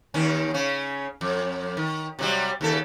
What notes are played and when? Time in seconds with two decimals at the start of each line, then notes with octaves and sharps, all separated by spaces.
0.14 D#2 D#3 C#4
0.54 C#3 C#4
1.21 F2
1.77 D#3
2.19 C3 F#3 G3
2.61 D#2 C#3 A4